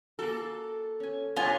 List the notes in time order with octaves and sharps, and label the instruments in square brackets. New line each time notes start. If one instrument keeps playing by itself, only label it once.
[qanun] A#3 F#4 [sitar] A4
[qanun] C#4 G#5
[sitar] G2 C3 [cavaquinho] F4 G#5 [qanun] C#5